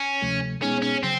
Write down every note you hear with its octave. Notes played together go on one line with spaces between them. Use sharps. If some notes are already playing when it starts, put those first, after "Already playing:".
Already playing: C#4
D2 C3 F3 A3
B2 G#3 B3 C#4 D#4 G#4
C#4
C#3 F#3 C4